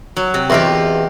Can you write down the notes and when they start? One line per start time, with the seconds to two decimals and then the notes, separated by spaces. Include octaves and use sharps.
0.17 F#3
0.34 C3
0.50 E2 B2 F4 G4